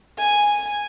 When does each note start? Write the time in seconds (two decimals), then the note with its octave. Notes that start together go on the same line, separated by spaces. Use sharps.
0.18 G#5